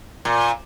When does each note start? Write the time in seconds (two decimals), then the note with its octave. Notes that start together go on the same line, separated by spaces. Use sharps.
0.25 A#2